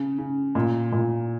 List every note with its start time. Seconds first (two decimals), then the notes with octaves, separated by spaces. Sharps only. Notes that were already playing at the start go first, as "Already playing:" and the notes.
Already playing: C#3
0.18 C#3
0.55 A#2
0.92 A#2